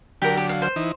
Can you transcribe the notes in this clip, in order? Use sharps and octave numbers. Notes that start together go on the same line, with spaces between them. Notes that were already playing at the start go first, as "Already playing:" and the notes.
D3 F#3 G4 A#4
G4
F5
C5
E3 D#4